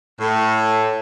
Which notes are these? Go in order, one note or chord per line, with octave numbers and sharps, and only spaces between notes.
A2